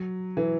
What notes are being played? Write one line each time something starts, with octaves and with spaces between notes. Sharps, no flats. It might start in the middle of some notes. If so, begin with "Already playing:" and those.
Already playing: F#3
E3